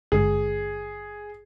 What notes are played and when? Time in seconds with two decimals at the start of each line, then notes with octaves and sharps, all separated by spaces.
0.12 G#1 G2 D3 G#3 G#4